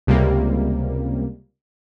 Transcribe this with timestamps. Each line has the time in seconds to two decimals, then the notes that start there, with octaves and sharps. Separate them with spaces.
0.07 C#2 C3 G3 A#3